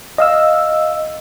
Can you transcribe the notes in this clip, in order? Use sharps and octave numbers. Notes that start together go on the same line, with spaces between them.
D#5 F5 E6